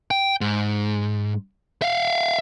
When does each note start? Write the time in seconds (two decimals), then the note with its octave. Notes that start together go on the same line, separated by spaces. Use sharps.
0.11 G5
0.41 G#2
1.82 E5 F5